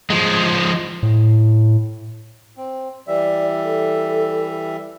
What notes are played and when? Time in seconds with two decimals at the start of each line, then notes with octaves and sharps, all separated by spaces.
0.10 F3 G#3
1.03 A2
2.57 C4
3.07 E3 G3 D5 E5
3.64 A4